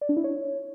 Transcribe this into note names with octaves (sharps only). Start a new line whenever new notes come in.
D5
D4
E4
C#5